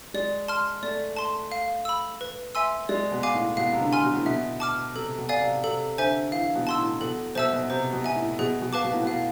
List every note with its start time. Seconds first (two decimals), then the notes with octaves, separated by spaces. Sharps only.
0.14 G#3 D5
0.48 A5 C6 F6
0.83 A3 D5
1.16 A5 C6
1.52 F5
1.85 B5 E6
2.21 B4
2.55 E5 G#5 C6 E6
2.89 G#3 D5
3.12 B2
3.23 F5 G#5 D6
3.35 A2
3.57 B2 F5
3.73 C3
3.80 D3
3.93 G#5 C6 F6
4.03 B2
4.16 A2
4.26 B2 E5
4.60 A5 D6 F6
4.95 C3 A4
5.18 B2
5.29 D5 F5 G#5
5.41 C3
5.64 C3 A4
5.98 D3 C5 E5 G#5
6.32 E3 F5
6.55 B2
6.67 A5 C6 E6
6.78 A2
7.01 B2 A4
7.35 B2 C5 E5 A5 E6
7.53 B2
7.70 C3 C5
7.93 B2
8.04 E5 G#5
8.16 A2
8.39 B2 G#4
8.62 B2
8.73 B4 F5 A5 D6
8.84 B2
8.93 A2
9.03 B2 F5